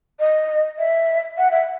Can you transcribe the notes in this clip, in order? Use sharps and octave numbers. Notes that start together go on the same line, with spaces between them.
D#5
E5
F#5
E5